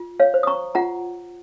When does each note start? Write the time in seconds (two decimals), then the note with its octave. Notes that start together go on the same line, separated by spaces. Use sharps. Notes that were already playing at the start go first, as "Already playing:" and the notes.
Already playing: F4
0.20 C#5 F5
0.34 C5
0.43 D#6
0.47 A#5 C#6
0.75 F4 F#5 A#5